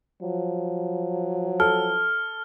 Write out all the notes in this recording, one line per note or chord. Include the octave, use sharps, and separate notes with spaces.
F3 F#3
A4 F6